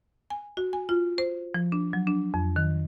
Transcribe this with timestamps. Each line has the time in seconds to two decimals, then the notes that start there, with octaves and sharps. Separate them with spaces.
0.30 G#5
0.57 F#4
0.73 G#5
0.89 F4
1.18 C5
1.54 F3
1.72 D4
1.93 F#3
2.07 D4
2.34 F2
2.56 D#3